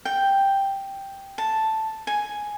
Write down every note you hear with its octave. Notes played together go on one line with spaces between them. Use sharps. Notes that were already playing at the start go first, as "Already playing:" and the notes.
G5
A5
G#5